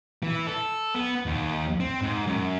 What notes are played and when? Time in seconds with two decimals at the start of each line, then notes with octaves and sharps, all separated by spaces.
0.23 E3
0.47 A4
0.95 B3
1.26 D#2
1.80 C4
2.02 G#2
2.27 F#2